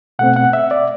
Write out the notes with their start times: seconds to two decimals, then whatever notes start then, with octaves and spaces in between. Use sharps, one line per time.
0.19 B2 A3 C4 F#5
0.36 F#5
0.53 E5
0.71 D5